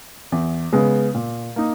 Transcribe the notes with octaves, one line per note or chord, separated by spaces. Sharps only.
E2
C#3 G#3 B3
A#2
A#3 D#4